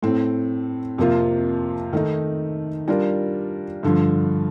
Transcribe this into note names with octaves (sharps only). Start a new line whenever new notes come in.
A2 A3 C4
F2 C3 F3 A#3 F4
D#3 A3 D#4
G3 D4 F4 A#4
G2 D3 F3